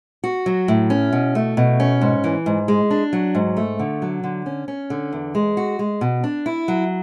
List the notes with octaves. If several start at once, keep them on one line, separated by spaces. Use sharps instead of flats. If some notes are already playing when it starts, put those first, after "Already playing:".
F#4
F#3
A2
C#4
B2
A3
B2
C#4
G#2
E3
G#2
G#3
D4
F#3
G#2
A3
D3
F#3
D3
C#4
C#4
D3
E2
G#3
F#4
G#3
B2
D4
E4
F#3